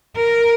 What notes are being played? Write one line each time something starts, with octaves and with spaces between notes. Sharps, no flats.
A#4